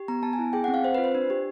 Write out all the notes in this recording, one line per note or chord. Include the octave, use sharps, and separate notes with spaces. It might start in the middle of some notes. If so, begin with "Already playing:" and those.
Already playing: G4
B3 A#5
B3 A5
G#5
E4
G#4 G5
F#5
C4
F5
C4 C5
B4
F4
C5
D4
G4